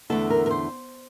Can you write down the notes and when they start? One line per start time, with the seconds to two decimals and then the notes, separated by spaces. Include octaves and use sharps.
0.10 E2 D3 A3 A4
0.30 A#4
0.46 A#4
0.51 C5